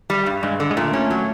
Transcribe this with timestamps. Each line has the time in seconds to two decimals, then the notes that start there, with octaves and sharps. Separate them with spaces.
0.10 G3
0.26 G2
0.43 G2 G#3
0.60 D3
0.71 G#3
0.77 A#2 A3
0.93 C#4
1.10 F#3